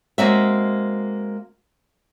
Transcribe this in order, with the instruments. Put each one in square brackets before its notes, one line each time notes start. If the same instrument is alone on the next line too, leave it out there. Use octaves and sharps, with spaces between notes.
[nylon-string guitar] G#3 A#3 C4 F#4 E5